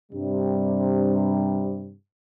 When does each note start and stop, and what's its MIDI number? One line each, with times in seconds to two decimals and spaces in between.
0.12 1.93 43
0.12 1.93 48
0.12 1.93 55